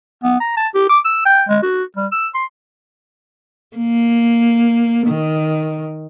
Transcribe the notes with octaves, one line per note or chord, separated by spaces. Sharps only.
B3
A#5
A5
G4
D6
E6
G5
G#3
F#4
G3
E6
C6
A#3
D#3